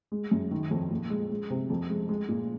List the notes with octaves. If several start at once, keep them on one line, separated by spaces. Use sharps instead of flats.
G#3
F#2
D#3
F2
A#2
G#3
G#3
C3
F2
G#3
G#3
A#2